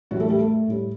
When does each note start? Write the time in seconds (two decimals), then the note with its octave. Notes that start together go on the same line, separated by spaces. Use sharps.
0.11 A2 E3 F#3 G3 F#4
0.20 A3 A4
0.30 G3 G4
0.39 A3 A4
0.68 A2 G3